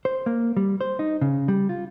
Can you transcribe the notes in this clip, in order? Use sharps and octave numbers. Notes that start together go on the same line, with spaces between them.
C5
A#3
G3
C5
D#4
C#3
G3
F4